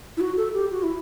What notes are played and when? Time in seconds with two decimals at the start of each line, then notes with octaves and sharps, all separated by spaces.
0.17 E4
0.21 F#4
0.37 A4
0.54 G4
0.71 F#4
0.83 E4